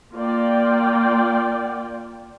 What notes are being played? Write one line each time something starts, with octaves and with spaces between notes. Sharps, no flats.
A#3 F4 D5 G5